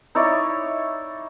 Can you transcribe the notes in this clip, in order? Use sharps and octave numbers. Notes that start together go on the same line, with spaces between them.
D#4 E4 C#5 D5